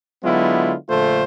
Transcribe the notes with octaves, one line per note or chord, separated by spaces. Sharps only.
D3 F#3 G#3 B3 E4 F4
A#1 D3 A3 F4 A4 C5